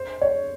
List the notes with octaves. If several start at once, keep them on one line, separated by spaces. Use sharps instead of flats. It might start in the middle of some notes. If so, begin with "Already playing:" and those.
Already playing: C5
C#5